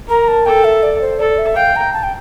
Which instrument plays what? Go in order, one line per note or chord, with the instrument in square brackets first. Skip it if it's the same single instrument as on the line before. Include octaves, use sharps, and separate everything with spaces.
[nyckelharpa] A#4 [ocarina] A#5
[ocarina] A5
[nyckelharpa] A4 [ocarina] G5
[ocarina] E5
D5
C5
[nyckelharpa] A4 [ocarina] D5
[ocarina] E5
[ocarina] F5 [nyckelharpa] G5
[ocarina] A#5
A5
G5